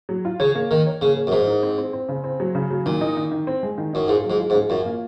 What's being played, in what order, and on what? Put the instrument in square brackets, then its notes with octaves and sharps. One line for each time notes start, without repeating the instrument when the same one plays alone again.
[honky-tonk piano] F#3
F4
[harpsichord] C#3 [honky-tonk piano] C#5
[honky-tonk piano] A#3
[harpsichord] D#3 [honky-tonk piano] A#4
[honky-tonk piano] C#5
[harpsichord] C#3 [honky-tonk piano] A#3
[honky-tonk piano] C#5
[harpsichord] F#2
[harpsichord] G#2 [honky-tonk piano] A#4
[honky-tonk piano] D#4
C4
C4
C4
C#3
C4
F#3
C#3
F#3
[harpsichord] A#2 [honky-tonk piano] D#3
[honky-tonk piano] D#4
D#3
D#3
C4
G#3
D#3
[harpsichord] F#2 [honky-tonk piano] D#4
[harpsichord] G#2 [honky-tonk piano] F4
[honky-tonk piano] F#3
[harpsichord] G#2
[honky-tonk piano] F4
[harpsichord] G#2
[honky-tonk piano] C#4
[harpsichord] F#2 [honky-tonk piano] F4
[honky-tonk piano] A#3